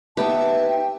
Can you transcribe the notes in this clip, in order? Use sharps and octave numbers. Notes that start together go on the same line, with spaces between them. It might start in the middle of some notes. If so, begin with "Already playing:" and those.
B3 D#4 G4 B4 E5 A5
G5